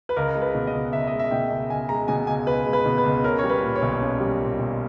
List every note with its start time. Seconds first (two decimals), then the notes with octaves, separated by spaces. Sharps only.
0.09 B4
0.16 C#2 A#4
0.35 G#3
0.41 B4
0.55 B2
0.67 D#5
0.74 C#2
0.93 C#2 E5
1.07 G#3 D#5
1.19 E5
1.31 B2 G5
1.50 C#2
1.70 C#2 G#5
1.89 G#3 A#5
2.08 B2 G#5
2.27 C#2 G#5
2.47 C#2 B4
2.66 G#3
2.73 B4
2.86 B2
2.98 B4
3.05 C#2
3.24 C#4 A#4
3.39 G3 C#5
3.49 B4
3.62 A#2
3.76 C#5
3.82 B1
4.01 C#4
4.20 G3
4.39 A#2
4.59 B1